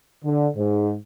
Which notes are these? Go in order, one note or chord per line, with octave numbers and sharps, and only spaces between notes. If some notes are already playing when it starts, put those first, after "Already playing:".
D3
G#2